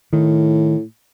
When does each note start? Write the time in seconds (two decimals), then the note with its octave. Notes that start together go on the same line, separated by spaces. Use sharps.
0.13 A2 D#3